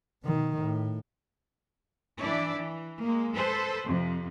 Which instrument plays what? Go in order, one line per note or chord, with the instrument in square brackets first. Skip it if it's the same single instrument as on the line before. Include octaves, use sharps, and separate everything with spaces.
[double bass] B2 D#3
A2
[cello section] E3 D4 E4 D5
E3
G#3 A#3
A4 B4 C5
F2 C3